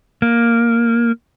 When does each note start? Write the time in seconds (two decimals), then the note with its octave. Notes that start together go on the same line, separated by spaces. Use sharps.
0.22 A#3